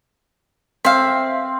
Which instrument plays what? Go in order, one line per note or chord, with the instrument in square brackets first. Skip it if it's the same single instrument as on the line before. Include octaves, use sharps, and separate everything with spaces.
[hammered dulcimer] C4 [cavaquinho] E5 F5